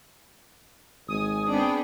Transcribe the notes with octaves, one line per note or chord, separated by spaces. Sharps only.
G#1 G#5 D#6
B3 C4 D4 G#4 G5